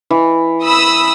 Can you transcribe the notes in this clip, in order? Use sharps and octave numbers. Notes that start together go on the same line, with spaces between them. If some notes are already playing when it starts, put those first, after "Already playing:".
E3
B5 D#6 E6